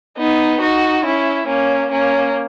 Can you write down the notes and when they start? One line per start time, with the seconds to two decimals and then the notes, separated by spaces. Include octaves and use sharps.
0.17 B3 D#4
0.60 D#4 F#4
1.04 C#4 E4
1.47 A#3 C#4
1.90 A#3 C#4